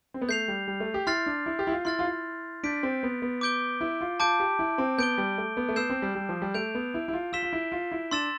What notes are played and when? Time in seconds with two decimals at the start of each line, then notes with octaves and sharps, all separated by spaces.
0.14 C4
0.21 B3
0.29 A3 G6 C7 F7
0.48 G3
0.68 G3
0.80 A3
0.94 G4
1.07 E4 C6 F6 A6 C7
1.26 D4
1.46 E4
1.59 G4
1.67 E4
1.72 F4
1.85 E4 C6 F6 A6
1.99 F4
2.05 E4
2.63 D4 G6 B6 D7
2.83 C4
3.03 B3
3.22 B3
3.41 D6 G6 D7 G7
3.81 E4
4.01 F4
4.20 F4 A5 D6 G6 D7
4.40 G4
4.59 E4
4.78 C4
4.98 B3 G6 D7 G7
5.18 G3
5.38 A3
5.57 B3
5.69 A3
5.76 B3 E6 G6 C7 E7
5.90 C4
6.02 G3
6.15 G3
6.29 F3
6.42 G3
6.54 A3 G6 D7 F7
6.75 B3
6.94 E4
7.08 E4
7.13 F4
7.33 F4 E6 B6 E7 G7
7.43 F4
7.53 E4
7.72 F4
7.92 E4
8.11 D4 C6 E6 A6 E7